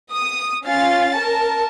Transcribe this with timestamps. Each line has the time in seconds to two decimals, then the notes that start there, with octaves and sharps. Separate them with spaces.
0.12 D#6
0.66 C#4 F4 F5 A6
1.17 A#4 A5